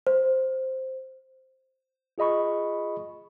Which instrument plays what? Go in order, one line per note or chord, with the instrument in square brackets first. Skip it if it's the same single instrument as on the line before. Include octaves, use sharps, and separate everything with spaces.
[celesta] C5
[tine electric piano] F4 G#4 D#5 B5 C#6